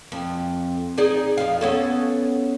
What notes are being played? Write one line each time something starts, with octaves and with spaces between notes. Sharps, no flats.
F2
D#4 G#4 D5
F2 F5
B3 C#4 A4